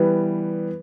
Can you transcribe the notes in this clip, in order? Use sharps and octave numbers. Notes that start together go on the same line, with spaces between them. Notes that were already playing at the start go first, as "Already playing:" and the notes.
Already playing: E3 G3 B3